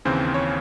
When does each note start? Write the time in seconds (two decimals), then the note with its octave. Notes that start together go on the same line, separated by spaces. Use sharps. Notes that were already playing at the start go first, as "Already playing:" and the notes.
0.05 D#2 C#3 E3 C4 C5
0.34 C#5